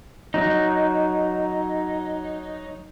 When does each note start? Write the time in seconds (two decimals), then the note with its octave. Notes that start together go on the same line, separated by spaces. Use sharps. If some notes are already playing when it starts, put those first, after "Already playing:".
0.34 F#3 D#4